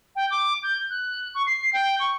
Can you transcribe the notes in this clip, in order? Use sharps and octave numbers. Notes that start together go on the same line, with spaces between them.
G5
D6
G6
F#6
C#6
C7
G5
C#6